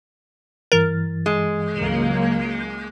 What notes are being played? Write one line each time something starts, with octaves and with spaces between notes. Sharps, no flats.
G2 E3 A#4 A6
G#3
C#2 F#3 A#3